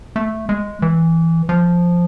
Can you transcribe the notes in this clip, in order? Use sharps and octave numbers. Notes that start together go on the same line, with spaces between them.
A3
G#3
E3
F3